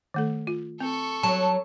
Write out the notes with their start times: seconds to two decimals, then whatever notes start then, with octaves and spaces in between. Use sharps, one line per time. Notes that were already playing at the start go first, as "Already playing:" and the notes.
0.14 D#3 A3 A4
0.47 F4
0.80 C4 A4 C#6
1.23 F#3 A5